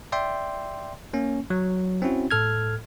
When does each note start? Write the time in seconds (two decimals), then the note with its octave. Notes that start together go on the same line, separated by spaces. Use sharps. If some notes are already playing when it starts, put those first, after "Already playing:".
0.12 D5 E5 G5 C6
1.13 A#3 C#4
1.50 F#3
2.02 C4 C#4 E4 F#4
2.31 A2 A4 F6 G#6